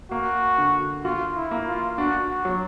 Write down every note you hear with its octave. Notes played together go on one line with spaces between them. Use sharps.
A#3 F#4
D3
F4 F#4
E4
A#3
F4
D4 F#4
F#4
F#3